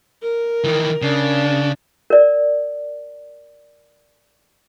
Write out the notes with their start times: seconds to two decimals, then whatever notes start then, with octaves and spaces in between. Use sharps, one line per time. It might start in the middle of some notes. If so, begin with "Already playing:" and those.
0.22 A#4
0.64 D#3 E3
1.02 C#3 D4
2.10 A#4 D5